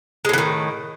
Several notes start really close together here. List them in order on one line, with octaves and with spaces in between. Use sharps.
G#3 A2 E3 D#3